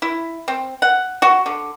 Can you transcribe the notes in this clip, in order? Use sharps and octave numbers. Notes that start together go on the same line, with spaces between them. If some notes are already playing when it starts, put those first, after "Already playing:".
E4
C4
F#5
F#4
D3